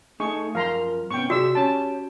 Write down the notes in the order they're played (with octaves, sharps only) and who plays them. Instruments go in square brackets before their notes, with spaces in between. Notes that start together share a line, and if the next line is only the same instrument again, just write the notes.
[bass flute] A3 [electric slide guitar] D#4 A4 [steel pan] G#4 C#6
[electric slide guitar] F#2 F3 [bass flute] A#4 [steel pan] F5 A#5 C6
[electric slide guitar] G#2 C3 C#4 [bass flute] B3 [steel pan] G5 C#6
[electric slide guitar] C3 [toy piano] F#4 [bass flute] G#4 [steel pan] D5 E5 E6
[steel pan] C#4 A5 [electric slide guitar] G4 [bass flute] C#5